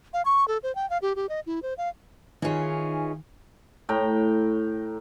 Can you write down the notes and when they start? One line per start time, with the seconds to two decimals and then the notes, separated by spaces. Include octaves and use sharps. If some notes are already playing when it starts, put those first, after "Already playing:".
0.13 F5
0.25 C#6
0.48 A4
0.63 C5
0.75 G5
0.90 F5
1.02 G4
1.16 G4
1.29 D#5
1.46 E4
1.63 C5
1.78 F5
2.42 D#3 E3 C#4 D#4 F4 G#4
3.89 A2 G5 A#5